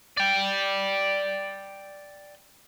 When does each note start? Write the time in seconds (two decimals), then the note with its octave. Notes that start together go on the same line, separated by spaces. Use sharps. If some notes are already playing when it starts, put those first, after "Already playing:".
0.17 D5 G5